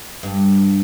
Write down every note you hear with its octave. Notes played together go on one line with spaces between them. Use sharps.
G2